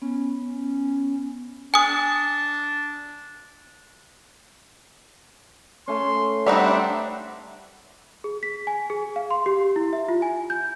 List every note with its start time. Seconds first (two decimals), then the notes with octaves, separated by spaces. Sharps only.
0.02 B3 C#4
1.74 D4 G#5 D#6
5.88 A3 C#4 C6
6.46 G3 C4 D4 D#4 E5 F#5 B5
8.24 G#4
8.43 B6
8.67 G#5
8.90 G#4
9.16 F5
9.31 C6
9.46 G4
9.76 E4
9.93 E5
10.09 F4
10.22 G#5
10.50 G6